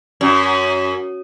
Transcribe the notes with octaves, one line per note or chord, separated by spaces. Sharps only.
F#2